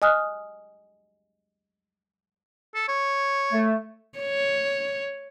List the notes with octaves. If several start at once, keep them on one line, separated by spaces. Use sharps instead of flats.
D#5 G#5 D#6 F6 F#6
A4
C#5
A3
C#5